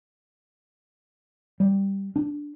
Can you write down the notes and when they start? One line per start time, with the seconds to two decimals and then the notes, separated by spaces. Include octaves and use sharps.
1.60 G3
2.16 D4